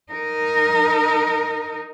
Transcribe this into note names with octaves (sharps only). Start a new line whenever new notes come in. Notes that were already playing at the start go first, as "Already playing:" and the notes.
D#4 A#4